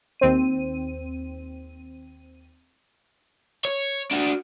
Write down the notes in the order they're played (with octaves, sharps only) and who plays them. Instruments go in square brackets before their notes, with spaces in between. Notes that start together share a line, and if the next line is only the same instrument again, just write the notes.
[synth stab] D#2 C4 D#7
[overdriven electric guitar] C#5
D4 F#4